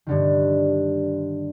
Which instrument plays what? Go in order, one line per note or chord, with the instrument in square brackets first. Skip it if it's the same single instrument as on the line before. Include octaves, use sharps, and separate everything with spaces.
[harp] G2 D3 D#3